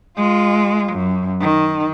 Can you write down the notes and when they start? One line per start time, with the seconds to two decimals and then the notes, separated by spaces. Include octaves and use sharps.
0.17 G#3 F4
0.93 F#2
1.41 D#3